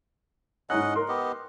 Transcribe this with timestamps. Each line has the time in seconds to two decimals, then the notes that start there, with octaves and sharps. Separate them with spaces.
0.70 G#2 C#4 E4 D#5 F#5 F#6
0.96 A#4 C6
1.08 B3 G4 D#5